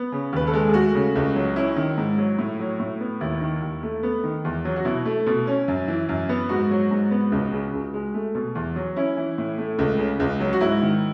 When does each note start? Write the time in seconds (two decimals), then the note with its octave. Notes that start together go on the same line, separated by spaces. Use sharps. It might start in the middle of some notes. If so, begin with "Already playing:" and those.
Already playing: B3
0.12 C#3
0.33 D#2 B4
0.47 A4
0.53 G#3
0.68 G#4
0.74 A3 F#4
0.95 C#3
1.15 C#2
1.35 F#3
1.56 C#4 E4
1.76 D#3
1.97 G#2
2.18 F#3
2.38 A2
2.59 F#3
2.80 A2
3.00 B3
3.21 D#2 E4
3.41 D#3
3.62 D#2
3.83 A3
4.03 B3
4.24 D#3
4.45 E2
4.65 F#3
4.76 F#4
4.85 B2 E4
5.05 A3
5.26 B2
5.47 C#4
5.68 F#2
5.88 E3
6.09 F#2
6.29 B3
6.49 G#2 F#4
6.71 F#3
6.91 G#2
7.11 B3
7.32 C#2
7.53 C#3
7.74 C#2
7.94 G#3
8.14 A3
8.35 B2
8.55 E2
8.76 F#3
8.96 C#4 E4
9.17 E3
9.38 A2
9.58 A3
9.78 C#2
9.99 C#3
10.20 C#2
10.40 F#3
10.53 F#4
10.61 G#2 E4
10.82 D#3